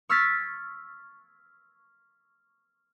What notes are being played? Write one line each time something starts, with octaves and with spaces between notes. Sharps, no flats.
C#6 E6 F6 G#6 A6 B6